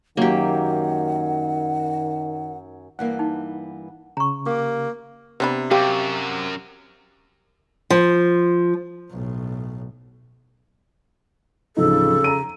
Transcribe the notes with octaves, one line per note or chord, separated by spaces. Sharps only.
F#2 D#3 A#3 G4 F#5
G2 E3 A#3 F#5
D#4
C#3 A#5 C#6
A#3 G4 D6
C3 B3 D4 B5
F#2 G4 F5
F3
B1 A2
D1 C#3 F3 D#4 A4
A#5 D#7